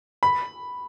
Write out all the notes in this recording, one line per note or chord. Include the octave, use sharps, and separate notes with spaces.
B5